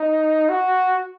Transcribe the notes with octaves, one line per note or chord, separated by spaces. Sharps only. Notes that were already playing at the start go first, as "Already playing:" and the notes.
Already playing: D#4
F#4